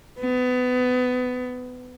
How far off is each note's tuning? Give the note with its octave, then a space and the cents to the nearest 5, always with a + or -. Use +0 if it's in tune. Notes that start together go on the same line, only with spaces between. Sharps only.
B3 +25